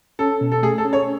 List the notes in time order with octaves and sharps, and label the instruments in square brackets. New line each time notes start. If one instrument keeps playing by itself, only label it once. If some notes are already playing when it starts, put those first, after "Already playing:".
[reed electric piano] C#4 [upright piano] A4
[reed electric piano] B2
[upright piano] A4
[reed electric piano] A3 [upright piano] G#4
[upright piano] A4
[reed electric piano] C#4
[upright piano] C#5